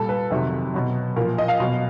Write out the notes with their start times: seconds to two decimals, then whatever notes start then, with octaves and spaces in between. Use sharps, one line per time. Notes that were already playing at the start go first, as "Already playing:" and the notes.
Already playing: A#2 G3 A4
0.09 B4
0.30 F2 C3 D#3 F#3
0.74 B2 F#3
1.16 A#2 A#4
1.20 F3
1.38 D#5
1.48 F5
1.60 B2 F#3